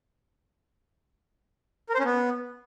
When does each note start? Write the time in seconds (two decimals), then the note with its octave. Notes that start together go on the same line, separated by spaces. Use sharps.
1.89 A#4
1.94 C5
2.00 C#4
2.05 B3